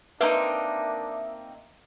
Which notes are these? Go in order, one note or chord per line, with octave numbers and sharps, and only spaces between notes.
A#3 C4 D4 D#4 B4 E5